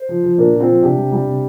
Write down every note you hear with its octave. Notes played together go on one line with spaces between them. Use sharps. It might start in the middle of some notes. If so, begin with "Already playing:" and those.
Already playing: C5
F3
F3
A#2 A#3 D4
A#2
C4 F4
F3
C3 D4 G4
G3
G3
C3